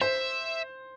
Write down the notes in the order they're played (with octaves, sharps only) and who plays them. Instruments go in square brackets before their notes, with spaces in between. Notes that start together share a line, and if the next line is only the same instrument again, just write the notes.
[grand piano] C5 [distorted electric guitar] E5